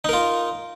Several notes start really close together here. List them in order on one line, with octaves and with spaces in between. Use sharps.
D#4 A#4 F4